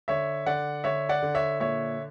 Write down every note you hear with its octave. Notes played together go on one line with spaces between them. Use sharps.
D3 C#5 E5
D3 D5 F#5
D3 C#5 E5
D5 F#5
D3
C#5 E5
A#2 C#5 E5